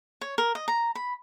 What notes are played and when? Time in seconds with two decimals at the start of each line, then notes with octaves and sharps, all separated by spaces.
0.21 C#5
0.38 A#4
0.55 D#5
0.68 A#5
0.95 B5